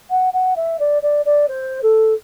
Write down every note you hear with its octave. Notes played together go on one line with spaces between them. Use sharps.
F#5
F#5
E5
D5
D5
D5
C5
A4